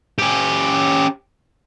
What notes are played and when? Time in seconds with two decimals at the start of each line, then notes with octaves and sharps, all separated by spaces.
0.19 C#4 G4